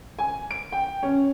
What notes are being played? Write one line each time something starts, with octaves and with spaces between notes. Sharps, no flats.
G#5
D7
G5
C#4